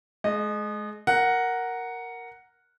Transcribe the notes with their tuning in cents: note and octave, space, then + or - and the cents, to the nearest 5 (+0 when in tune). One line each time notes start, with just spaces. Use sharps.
G#3 +35 D#5 -20
A#4 +0 F#5 +0